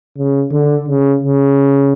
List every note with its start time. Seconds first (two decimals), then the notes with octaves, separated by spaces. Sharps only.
0.18 C#3
0.52 D3
0.88 C#3
1.23 C#3